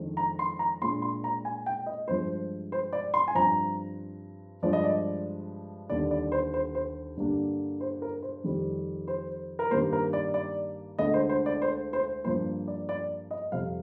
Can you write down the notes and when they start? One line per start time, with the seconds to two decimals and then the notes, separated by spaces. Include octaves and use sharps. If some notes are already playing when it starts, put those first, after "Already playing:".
Already playing: F2 D#3 G#3 D4
0.17 A#5
0.39 C6
0.59 A#5
0.82 A#2 G#3 D4 C6
1.02 C6
1.24 A#5
1.45 G#5
1.66 G5
1.86 D#5
2.08 G2 F3 G#3 C5
2.72 C5
2.93 D5
3.14 C6
3.28 G#5
3.35 G2 F3 C4 A#5
4.62 G2 F3 G#3 D5
4.73 D#5
4.84 D5
5.90 D#2 D3 G3 D5
6.11 D5
6.32 C5
6.54 C5
6.75 C5
7.17 G2 D3 G3 A#3 D4
7.81 C5
8.02 A#4
8.22 C5
8.44 F2 D#3 G3
9.08 C5
9.59 A#4
9.71 G2 D#3 G3 A#3 C5
9.93 A#4
10.13 D5
10.34 D5
10.99 D2 D3 G#3 D#5
11.14 C5
11.29 C5
11.46 D5
11.62 C5
11.93 C5
12.24 G2 F3 A#3 C5
12.68 D5
12.89 D5
13.31 D#5
13.52 F2 C3 G3 F5